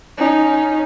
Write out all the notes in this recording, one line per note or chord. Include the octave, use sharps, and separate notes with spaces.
C#4 D#4